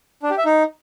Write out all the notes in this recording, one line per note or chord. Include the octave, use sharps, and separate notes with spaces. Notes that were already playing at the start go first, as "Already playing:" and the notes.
D4
G4
E5
D#4